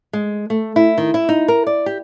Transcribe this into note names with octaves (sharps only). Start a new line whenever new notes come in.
G#3
A3
E4
D#3
E4
D#4
A#4
D5
G4